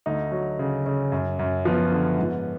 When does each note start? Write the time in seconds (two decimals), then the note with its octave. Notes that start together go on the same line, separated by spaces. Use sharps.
0.06 D2 D#4
0.32 F#3
0.59 C#3
0.86 C#3
1.12 F#2
1.39 F#2
1.65 F3 B3
1.91 D3
2.18 G#2